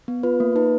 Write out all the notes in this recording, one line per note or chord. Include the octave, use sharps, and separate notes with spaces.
B3
F4 B4
A#3
D#4 B4